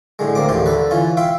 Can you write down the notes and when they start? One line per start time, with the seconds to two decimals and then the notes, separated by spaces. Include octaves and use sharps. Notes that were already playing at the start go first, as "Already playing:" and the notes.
0.19 A2 D3 G#3
0.35 D2 A#3 C4 D6
0.49 A1 D#2 A2 D3 A3 C6
0.66 D3 A4 B4
0.91 E3 C#4 F4
1.17 E5 F5 G5 C6